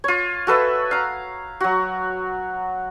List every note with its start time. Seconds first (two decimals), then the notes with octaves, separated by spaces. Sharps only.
0.04 F4 C#5
0.47 F#4 A4 B4 E5
0.91 F5 A#5
1.60 F#3 F#4